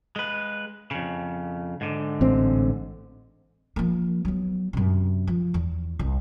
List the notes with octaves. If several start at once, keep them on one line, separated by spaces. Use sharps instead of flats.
G#3 B4
F2 C#3
G#2 D3
A1 C4
F3 A#3
F#3 B3
F#2 C3
F3
E2
C2